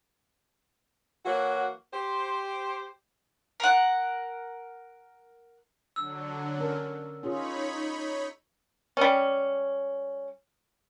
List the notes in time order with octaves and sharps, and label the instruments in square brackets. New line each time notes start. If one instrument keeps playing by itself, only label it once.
[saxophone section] E3 F#3 A#3 F#4
G4 C5
[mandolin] A#4 F#5
[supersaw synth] D3 F#3 [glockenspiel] E6
[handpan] C#4 A#4
[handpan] C#4 F4 G#4 [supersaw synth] D#4 C#5 B5
[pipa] G3 C#4